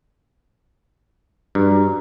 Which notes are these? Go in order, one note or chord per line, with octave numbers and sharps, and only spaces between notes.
G2 D4 F#4 A#5